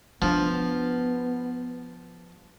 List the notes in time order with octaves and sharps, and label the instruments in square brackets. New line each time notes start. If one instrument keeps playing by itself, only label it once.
[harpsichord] F3 [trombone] B3 [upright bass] D4